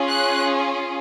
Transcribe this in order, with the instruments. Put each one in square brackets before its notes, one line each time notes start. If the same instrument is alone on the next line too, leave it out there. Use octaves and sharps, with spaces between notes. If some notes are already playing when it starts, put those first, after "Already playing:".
Already playing: [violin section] C#4 F4 G#4
F#6